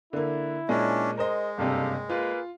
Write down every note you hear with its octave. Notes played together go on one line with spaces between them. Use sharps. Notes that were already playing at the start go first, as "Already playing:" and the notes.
D3 A#3 E4
A#2 G#3 C#4 D4
G#3 A#4 C5 D#5
F#1 G2 C3 G4 A4 F5
A#3 F4 G#4 B4